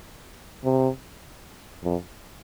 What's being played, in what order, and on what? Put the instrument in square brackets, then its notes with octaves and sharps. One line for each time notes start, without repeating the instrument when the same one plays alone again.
[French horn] C3
F2